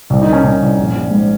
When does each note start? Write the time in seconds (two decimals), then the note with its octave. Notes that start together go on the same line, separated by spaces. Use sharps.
0.10 C2
0.22 D#4
0.27 D#3
0.33 C#4
0.44 C2 C#4
0.61 C2
0.78 A#1
0.94 A#1
1.11 G#2